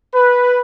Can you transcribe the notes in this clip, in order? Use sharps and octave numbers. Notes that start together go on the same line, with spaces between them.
B4